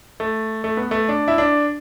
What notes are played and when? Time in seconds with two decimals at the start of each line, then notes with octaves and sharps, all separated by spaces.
0.20 A3
0.64 A3
0.77 B3
0.91 A3
1.09 D4
1.28 E4
1.38 D4